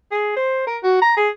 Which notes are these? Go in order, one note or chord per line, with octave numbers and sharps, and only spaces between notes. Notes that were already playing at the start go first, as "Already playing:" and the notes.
G#4
C5
A#4
F#4
A#5
G#4